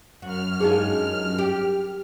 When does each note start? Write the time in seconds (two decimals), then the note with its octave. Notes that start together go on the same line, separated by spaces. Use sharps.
0.22 F#2 F#4 F6
0.60 G2 G#3 D#4 F4 G#4
1.38 G4